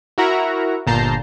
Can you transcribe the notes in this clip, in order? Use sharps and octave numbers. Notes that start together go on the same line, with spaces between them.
E4 F#4 A#4 E5 F#5 A#5
G1 A#2 A5 A#5 G6 C7